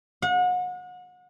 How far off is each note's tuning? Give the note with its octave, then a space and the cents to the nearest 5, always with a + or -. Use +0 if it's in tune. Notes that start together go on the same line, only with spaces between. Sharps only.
F#5 -35